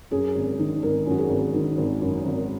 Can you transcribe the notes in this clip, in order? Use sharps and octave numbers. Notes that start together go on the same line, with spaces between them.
F#2 G#4
G#1
D#3
G#1 A#4
F#2 F#4
G#4
G#1
D#3
G#1
F#2
G#1